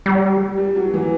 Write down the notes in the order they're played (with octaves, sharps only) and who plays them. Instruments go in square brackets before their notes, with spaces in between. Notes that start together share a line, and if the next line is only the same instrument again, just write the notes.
[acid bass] G3
[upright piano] G3
F#3
F#3
E3